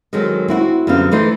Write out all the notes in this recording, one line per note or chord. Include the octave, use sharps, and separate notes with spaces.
D#3 F#3 G#3 C4 A4
C4 E4 F#4
F#2 D3 G3 B3 C4 F5
E3 A3 D#4 C5